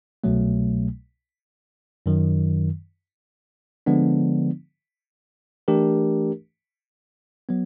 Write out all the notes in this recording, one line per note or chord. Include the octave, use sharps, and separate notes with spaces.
C2 B2 F#3 A3
F#2 D#3 F#3
D3 F3 G#3 B3 D4
E3 A3 D4 G4 A#4
F#3 B3